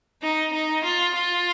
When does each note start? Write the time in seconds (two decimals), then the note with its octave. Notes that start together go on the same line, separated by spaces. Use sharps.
0.23 D#4
0.53 D#4
0.84 F4
1.15 F4